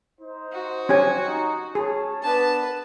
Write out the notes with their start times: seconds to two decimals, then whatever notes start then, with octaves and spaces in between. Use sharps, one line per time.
0.20 D#4 C5
0.52 F#4
0.89 C#4 G4 G#5
1.23 D#4
1.75 C#4 G#4 C#5 A5
2.22 B3 D4 B4 A5